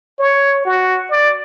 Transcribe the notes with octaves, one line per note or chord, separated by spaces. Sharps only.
C#5
F#4
D5